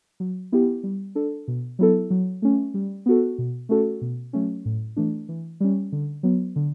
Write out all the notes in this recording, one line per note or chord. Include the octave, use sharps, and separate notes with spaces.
F#3
B3 E4 G4
G3
D4 A4
B2
F#3 B3 E4 A4
F#3
A3 C#4
G3
B3 F#4 A4
B2
A3 C#4 F#4 A4
B2
F#3 A3 C#4
A2
E3 A3 D4
E3
G3 C#4
D3
F#3 B3
D3